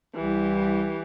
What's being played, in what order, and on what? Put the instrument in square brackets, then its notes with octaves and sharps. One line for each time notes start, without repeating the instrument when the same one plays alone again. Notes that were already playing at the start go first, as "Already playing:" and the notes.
[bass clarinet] C2 [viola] E3 G4